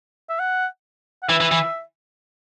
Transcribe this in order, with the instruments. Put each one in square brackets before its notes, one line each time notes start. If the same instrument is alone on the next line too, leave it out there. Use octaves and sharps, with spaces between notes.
[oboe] E5
F#5
F#5
[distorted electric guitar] E3 [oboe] E5
[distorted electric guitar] E3
E3